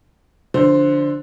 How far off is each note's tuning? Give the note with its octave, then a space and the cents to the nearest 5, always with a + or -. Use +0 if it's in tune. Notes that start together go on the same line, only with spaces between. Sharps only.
D3 +0 F3 +0 C5 +0